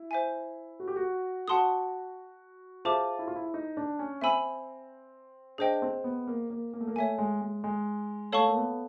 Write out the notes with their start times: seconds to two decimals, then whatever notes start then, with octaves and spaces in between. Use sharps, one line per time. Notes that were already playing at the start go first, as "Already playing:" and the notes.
Already playing: E4
0.11 C5 E5 G#5
0.80 F#4
0.88 G4
0.96 F#4
1.48 F#4 F#5 A5 C6 D#6
2.85 F4 G#4 C5 E5 A5 D6
3.19 E4
3.28 F4
3.36 E4
3.54 D#4
3.77 D4
3.99 C#4
4.21 C4 E5 G#5 B5 E6
5.58 D4 G#4 C5 D#5 G5
5.82 C4
6.04 B3
6.27 A#3
6.50 A#3
6.73 A#3
6.81 A3
6.87 A#3
6.96 A3 C#5 E5 G#5
7.19 G#3
7.41 G#3
7.64 G#3
8.32 A3 A4 C#5 F5 A5 C#6
8.48 A#3
8.56 B3